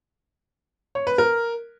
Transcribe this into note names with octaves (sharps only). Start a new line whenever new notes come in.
C#5
B4
A#4